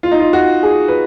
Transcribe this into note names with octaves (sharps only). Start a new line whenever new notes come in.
F4
D#4
F4
F#4
G#4
B4